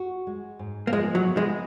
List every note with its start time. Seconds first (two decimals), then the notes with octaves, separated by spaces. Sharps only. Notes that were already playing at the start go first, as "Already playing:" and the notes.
Already playing: F#4
0.27 G#3
0.59 G#2
0.87 A#3
0.92 F3 G#3
1.15 F#3
1.26 B3
1.37 G#3